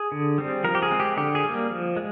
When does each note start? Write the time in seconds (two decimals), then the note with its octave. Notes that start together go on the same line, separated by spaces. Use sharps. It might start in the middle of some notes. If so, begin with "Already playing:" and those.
Already playing: G#4
0.12 D3
0.38 G3 C4
0.64 F3 A#4
0.75 G4
0.83 G#4
0.91 G#3 C4
1.00 G4
1.17 D3 G4
1.35 G#4
1.44 G3 A#3
1.70 F3
1.97 G#3